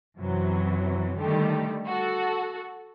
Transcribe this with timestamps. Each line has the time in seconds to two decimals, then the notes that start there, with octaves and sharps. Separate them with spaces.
0.19 F#2 C3 E3 F#3
1.19 D3 D#3 G3 A3 G4
1.86 F#4 A4